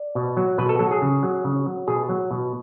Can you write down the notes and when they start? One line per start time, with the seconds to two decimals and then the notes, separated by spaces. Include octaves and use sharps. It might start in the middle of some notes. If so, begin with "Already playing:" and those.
Already playing: D5
0.15 B2
0.37 F#3
0.58 B2 B4
0.69 A4
0.79 F#3 A4
0.91 G#4
1.02 C#3
1.23 F#3
1.44 C#3
1.66 F#3
1.88 B2 G#4
2.09 F#3
2.31 B2